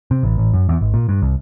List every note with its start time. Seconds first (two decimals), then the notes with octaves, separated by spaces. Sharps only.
0.11 C3
0.23 A1
0.38 A1
0.53 F#2
0.69 E2
0.81 G#1
0.94 A#2
1.09 G2
1.22 C2